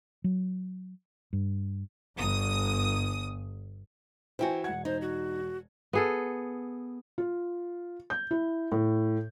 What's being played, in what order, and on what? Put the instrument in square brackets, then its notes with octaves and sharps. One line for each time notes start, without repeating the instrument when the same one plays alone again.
[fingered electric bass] F#3
G2
[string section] G1 D#6
[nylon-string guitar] E3 E4 F#4 [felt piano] C5 G5 G#5
[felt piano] E1 G#6 [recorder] F#5
[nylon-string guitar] D#4 [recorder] C5
[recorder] F#4
[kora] B3 G#4 A4
[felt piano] F4
G6
E4
A2